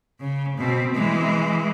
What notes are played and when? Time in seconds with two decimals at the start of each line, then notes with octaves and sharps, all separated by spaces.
0.20 C#3
0.57 B2 C4
0.94 E3 G#3